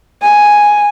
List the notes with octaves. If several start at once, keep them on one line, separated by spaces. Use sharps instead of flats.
G#5